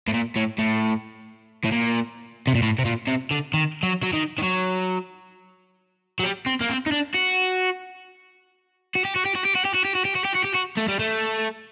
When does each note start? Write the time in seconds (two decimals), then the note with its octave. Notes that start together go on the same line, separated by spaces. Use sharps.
0.08 A2
0.14 A#2
0.36 A2
0.59 A2
1.65 A2
1.72 A#2
2.47 C3
2.55 A#2
2.62 A2
2.78 C3
2.85 A#2
3.07 C3
3.31 D3
3.53 D#3
3.83 F#3
4.03 F#3
4.13 D#3
4.38 D#3
4.43 F#3
6.20 F#3
6.24 G3
6.46 C4
6.61 A#3
6.69 C4
6.87 D#4
6.92 D4
7.15 F#4
8.95 F#4
9.05 G4
9.16 F#4
9.26 G4
9.35 F#4
9.45 G4
9.56 F#4
9.65 G4
9.75 F#4
9.85 G4
9.95 F#4
10.05 G4
10.15 F#4
10.25 G4
10.35 F#4
10.44 G4
10.54 F#4
10.77 A3
10.88 G3
10.99 A3